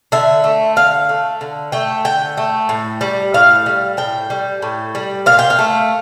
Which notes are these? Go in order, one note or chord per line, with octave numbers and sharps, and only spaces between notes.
D3 E5
A3
D3 F5
A3
D3
A3 G5
D3 G5
A3
A2
G3
A2 F5
G3
A2 G5
G3
A2
G3
A#2 F5
G5
F5
A3